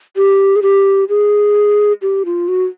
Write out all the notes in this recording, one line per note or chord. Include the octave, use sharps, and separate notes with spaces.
G4
G#4
G4
G#4
G4
F4
F#4